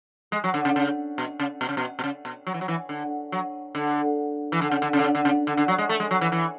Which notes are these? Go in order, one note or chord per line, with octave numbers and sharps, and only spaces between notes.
G#3
F#3
D3
C#3
C#3
B2
C#3
B2
C#3
B2
B2
C#3
B2
F#3
E3
F#3
E3
D3
F#3
D3
E3
D3
C#3
D3
C#3
D3
C#3
D3
C#3
D3
D3
F#3
G#3
A3
G#3
F#3
E3
E3